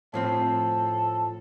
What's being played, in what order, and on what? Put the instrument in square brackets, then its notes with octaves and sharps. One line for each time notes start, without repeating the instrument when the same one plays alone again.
[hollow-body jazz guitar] A2 F3 C4 [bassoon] A4